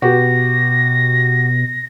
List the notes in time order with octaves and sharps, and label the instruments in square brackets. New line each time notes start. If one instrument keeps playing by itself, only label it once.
[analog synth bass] B2 [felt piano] F#4 G4 B4 [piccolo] A#6